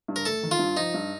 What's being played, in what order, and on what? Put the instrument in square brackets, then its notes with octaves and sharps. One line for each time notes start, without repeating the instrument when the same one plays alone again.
[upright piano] G2
[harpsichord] A#4
[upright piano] A3 [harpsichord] A4
[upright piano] D#3
[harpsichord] F4
[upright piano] G2
[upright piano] F3 [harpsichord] D#4
[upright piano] G2